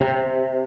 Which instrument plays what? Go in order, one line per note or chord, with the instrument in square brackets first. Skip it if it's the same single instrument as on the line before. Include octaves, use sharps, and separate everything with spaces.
[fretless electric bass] C3